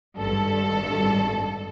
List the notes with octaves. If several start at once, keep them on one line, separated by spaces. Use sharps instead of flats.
G#1 G2 A4